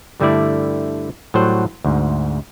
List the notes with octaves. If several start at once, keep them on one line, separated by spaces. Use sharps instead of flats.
G2 D3 G3 A3 E4 D5
A2 F#3 G3 C5 F#5
D2 G#2